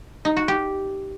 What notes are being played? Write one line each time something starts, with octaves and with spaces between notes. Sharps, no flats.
D#4
F#4
G4